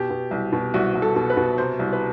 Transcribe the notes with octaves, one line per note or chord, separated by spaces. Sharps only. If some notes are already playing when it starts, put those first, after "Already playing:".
Already playing: B2 G4
B2
C2
B2
C2 F#4
C2
A4
B2
B4
B2
C3 C5
C2
B4